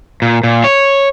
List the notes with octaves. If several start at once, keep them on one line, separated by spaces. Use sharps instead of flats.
A#2
A#2
C#5